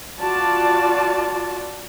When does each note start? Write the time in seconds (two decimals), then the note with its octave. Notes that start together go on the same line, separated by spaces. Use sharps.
0.20 F4 F#4 D5 A5